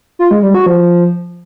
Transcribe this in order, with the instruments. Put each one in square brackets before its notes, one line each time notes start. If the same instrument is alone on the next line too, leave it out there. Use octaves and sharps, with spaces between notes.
[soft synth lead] F4
G#3
G3
F#4
F3